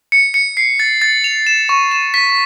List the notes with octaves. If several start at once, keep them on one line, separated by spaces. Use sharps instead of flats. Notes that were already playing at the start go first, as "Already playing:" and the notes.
C#7
C#7
C7
A6
A6
F7
E7
C#6
E7
B6